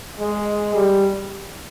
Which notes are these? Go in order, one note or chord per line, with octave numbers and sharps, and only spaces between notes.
G#3
G3